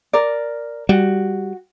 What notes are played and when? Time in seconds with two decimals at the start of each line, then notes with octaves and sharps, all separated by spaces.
0.13 A#4 D5
0.89 G3 F#4